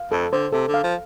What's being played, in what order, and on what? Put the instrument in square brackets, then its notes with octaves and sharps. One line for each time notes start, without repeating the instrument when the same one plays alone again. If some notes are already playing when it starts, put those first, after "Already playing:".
Already playing: [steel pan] F5
[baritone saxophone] F2 [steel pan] A4
[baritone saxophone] D3 [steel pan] C5
[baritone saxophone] C3 [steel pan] A4
[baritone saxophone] D3
[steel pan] F5
[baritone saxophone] F3